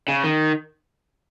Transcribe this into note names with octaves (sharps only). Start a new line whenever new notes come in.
C#3
D#3